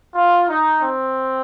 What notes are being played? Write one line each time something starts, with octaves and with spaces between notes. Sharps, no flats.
F4
D#4
C4